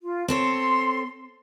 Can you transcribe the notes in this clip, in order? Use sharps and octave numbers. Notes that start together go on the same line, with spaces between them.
F4
C4 A4 C#5 C6